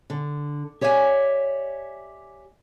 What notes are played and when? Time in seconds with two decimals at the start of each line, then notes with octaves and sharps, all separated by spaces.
0.10 D3
0.81 G4 C#5 D5 E5 F5 G#5